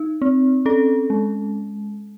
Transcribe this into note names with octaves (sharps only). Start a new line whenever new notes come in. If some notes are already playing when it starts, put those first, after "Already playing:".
Already playing: D#4
C4
C#4 A4
G#3